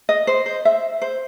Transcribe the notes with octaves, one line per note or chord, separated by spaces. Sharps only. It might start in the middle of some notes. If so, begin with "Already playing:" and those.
D#5
C5
C5
E5
C5